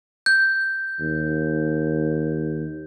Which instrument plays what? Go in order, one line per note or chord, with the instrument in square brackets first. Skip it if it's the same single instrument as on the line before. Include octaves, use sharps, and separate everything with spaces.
[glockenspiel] G6
[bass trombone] D#2